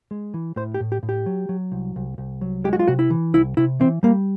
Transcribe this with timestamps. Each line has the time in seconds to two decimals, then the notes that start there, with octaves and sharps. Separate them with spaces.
0.11 G#3
0.34 E3
0.56 A2 C5
0.74 G4
0.81 A2
0.92 G4
1.03 A2
1.09 G4
1.26 F#3
1.49 F#3
1.72 C2
1.96 C2
2.18 C2
2.41 F#3
2.64 G#3 G4
2.73 F#4
2.79 F4
2.87 C3 F#4
2.99 E4
3.10 E3
3.34 C2 E4
3.57 C3 E4
3.80 E3 C4
4.03 G3 A#3